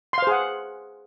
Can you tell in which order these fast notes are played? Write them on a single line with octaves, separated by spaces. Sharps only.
C6 F5 C5 G#4 F#5